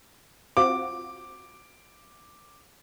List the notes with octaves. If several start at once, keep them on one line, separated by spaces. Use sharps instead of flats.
C4 F4 F#4 D6